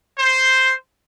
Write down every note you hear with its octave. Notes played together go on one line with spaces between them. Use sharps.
C5